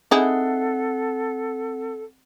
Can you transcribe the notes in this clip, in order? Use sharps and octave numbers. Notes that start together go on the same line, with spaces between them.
C4 D#4 E4 G#4 A4 F#5